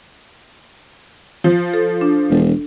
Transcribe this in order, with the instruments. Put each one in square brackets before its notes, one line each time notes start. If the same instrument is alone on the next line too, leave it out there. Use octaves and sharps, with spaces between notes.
[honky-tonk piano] F3
[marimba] A4
D4
[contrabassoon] E1